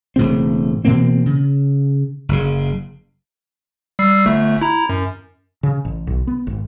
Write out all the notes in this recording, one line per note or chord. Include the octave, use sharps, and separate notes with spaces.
E1 A2 C#3 C4
B2 E3 A#3 C4
C#3
F#1 C#3
G3 E6 C7
G1 A3
E4 A#5
F#2
C#3
A1
B1
B3
G#1